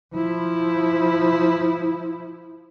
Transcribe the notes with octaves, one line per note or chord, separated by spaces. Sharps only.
F3 E4